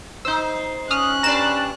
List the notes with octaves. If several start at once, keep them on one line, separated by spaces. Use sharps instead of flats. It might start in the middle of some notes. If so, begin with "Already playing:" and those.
D#4 C5 E6 G6
C#4 D#6 F6 F#6
G2 D4 D5 A#5 E7